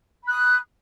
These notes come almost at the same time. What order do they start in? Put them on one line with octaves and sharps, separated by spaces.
B5 F#6 D#6